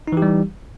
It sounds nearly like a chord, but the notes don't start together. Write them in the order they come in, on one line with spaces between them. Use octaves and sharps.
D#4 E3 G4 G3